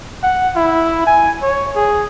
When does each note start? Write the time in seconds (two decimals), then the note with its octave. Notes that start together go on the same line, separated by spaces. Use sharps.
0.23 F#5
0.55 E4
1.06 G#5
1.42 C#5
1.76 G#4